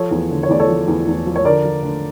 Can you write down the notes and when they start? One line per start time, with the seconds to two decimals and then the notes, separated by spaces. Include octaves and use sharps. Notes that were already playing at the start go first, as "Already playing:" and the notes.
Already playing: F3 A4 C#5
0.11 E2
0.30 D3
0.43 C#5
0.49 E2 D5
0.59 A4 C#5
0.68 F3
0.88 E2
1.07 E2
1.26 F3
1.36 C#5
1.44 D3 A#4 D5
1.65 F3
1.83 D3